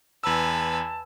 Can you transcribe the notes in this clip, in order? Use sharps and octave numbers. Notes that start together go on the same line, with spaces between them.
E2 B4 G#5 A5 E6